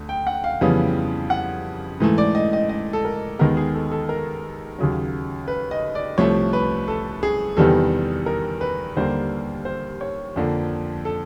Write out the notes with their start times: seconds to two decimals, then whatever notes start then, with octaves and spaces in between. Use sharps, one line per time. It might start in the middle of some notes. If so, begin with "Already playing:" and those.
Already playing: D2 D3 A3
0.09 G5
0.27 F#5
0.44 F5
0.61 F2 C#3 E3 G3 B3
1.30 F#5
2.00 G#2 E3 A3
2.18 D5
2.35 D#5
2.53 D#5
2.69 D#5
2.93 A4
3.05 A#4
3.39 D#2 D#3 G#3 B3 A#4
3.57 G#4
3.74 A4
3.92 A4
4.09 A#4
4.78 D#2 C#3 F#3
5.48 B4
5.71 D#5
5.95 D5
6.18 C2 C3 F3 A3 C#5
6.53 B4
6.88 A4
7.23 G#4
7.57 E2 C3 D#3 G3 B3 A4
8.26 A#4
8.61 B4
8.96 D#2 D3 G3 A#3 C5
9.65 C5
10.01 C#5
10.36 F2 D3 F3 A#3
11.05 A4